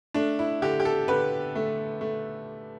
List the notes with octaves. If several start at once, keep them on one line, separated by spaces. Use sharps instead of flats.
A3 D4
E4
D3 G4
G4
A4
D3 B4
A3
A3